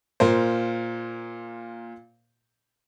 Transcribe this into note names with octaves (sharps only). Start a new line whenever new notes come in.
A#2 F4 A#4 C5